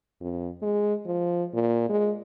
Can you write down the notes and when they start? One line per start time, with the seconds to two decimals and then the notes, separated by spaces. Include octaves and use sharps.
0.21 F2
0.62 G#3
1.06 F3
1.54 A#2
1.89 G#3